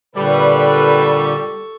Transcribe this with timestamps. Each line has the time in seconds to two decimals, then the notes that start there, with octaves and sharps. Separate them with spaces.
0.16 A#2 D3 G3 A4 B4 C#6